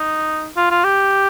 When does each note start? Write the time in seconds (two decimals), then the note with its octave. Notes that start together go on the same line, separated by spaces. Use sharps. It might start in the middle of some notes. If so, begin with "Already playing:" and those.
Already playing: D#4
0.56 F4
0.71 F4
0.84 G4